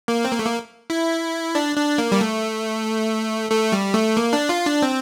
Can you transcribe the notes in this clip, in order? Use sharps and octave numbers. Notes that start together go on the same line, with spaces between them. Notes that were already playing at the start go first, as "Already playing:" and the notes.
A#3
C4
A#3
A3
A#3
E4
D4
D4
A#3
G3
A3
A3
G3
A3
A#3
D4
F4
D4
C4